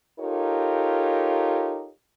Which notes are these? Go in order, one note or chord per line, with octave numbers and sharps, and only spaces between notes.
D#4 F4 G4 A4 A#4 C#5